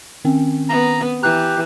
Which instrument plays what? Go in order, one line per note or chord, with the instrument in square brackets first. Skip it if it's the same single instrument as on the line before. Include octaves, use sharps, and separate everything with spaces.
[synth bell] D#3 C4 C#4
[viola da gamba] B3 [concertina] A#5
[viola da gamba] E3 [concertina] G4 [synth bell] A#5 F#6